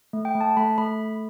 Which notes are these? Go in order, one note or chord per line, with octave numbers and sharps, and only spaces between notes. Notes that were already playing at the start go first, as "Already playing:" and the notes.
A3
G5
A3
A5
A3 B5
A3 B5